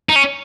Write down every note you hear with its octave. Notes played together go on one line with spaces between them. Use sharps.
D#4
C#4